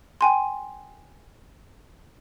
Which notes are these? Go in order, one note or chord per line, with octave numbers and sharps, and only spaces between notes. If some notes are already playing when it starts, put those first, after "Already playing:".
G5 G#5 C6